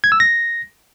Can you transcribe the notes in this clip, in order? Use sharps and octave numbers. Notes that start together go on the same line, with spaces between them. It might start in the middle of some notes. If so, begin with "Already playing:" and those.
G#6
E6
A#6